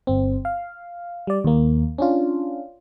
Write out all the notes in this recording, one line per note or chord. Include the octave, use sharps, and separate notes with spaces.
G1 C4
F5
G3 D5
D#2 A#3
C#4 D4 F4